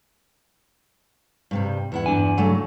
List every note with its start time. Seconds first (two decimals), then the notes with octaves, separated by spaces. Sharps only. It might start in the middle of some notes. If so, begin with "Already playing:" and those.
1.51 G2 C3 G3
1.92 E2 E4 F#5
2.06 G2 D4 G#5
2.37 C#3 F#3 A3